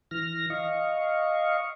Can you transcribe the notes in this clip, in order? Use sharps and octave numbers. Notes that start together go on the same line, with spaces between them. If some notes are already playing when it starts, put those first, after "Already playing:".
E3 F6 A#6
D#5 F5 C#6